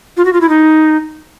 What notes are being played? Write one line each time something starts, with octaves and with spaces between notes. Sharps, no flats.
F4
F#4
F4
E4
D#4